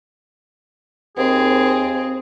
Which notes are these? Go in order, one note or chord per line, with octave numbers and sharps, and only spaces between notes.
D#2 C4 G#4